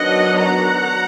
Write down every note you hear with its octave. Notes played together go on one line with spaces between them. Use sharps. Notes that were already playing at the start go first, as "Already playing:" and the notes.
Already playing: D#3 F#3 B3 D4 D#5 F#5
F#5 A#5